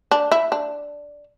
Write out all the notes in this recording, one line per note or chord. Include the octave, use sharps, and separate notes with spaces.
D4
E4
D4